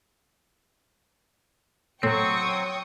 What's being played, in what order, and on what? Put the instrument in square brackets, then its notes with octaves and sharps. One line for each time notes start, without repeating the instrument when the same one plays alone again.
[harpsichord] A2 [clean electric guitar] F#3 C4 [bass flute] C#5 [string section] G5 C#6 D#6